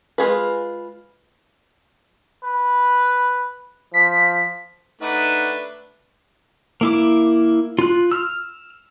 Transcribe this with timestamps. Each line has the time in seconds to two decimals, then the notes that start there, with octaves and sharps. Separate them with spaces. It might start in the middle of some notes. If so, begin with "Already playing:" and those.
0.18 G#3 F4 G#4 B4
2.44 B4
3.94 F3 B6
5.02 A3 D4 D#4 B4 F#5
6.81 A#3 E4 D6
7.79 F4 F#6
8.12 E6 F6